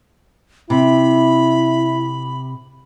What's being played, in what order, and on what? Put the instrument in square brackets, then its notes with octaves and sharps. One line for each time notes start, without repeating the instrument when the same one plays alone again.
[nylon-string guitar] C3 [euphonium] E4 [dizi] B5